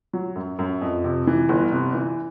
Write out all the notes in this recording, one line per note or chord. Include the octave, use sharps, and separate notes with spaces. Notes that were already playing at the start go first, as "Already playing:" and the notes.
F#3
F#2
F#2
F2
C3
E3
G1
C3
E3